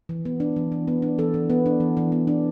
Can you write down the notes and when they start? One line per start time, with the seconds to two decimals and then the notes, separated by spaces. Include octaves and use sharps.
0.09 E3
0.25 B3
0.40 D4
0.56 E3
0.72 E3
0.88 B3
1.02 D4
1.18 E3 A4
1.34 E3
1.50 B3
1.66 D4
1.80 E3
1.97 E3
2.12 B3
2.27 D4